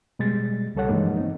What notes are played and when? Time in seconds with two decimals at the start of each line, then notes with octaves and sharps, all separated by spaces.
0.19 B2 G3 G#3 A6
0.75 C2 C#3 G3 A4 C#5 F#5
0.89 G2 E3 F3 G#3 A#3 D#4
1.17 C4 D#4